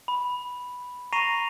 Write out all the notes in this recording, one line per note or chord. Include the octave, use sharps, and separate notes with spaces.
B5
A#5 C#6 A#6 C7 D#7 F7